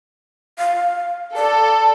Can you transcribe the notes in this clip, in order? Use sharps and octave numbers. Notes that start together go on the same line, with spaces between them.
F5
A4 D5